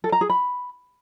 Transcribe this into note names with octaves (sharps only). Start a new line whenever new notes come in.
A4
A#5
G#4
B5